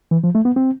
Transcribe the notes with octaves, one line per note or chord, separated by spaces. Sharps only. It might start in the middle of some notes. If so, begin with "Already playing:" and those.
E3
F3
A3
B3
C4